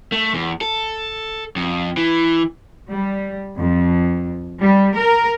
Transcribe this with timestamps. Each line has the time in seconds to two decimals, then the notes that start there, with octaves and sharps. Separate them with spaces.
0.12 A3
0.34 E2
0.61 A4
1.56 F2
1.97 E3
2.90 G3
3.57 F2
4.62 G3
4.98 A#4